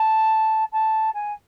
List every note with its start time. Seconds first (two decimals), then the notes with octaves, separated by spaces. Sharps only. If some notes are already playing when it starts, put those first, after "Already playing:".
Already playing: A5
0.72 A5
1.14 G#5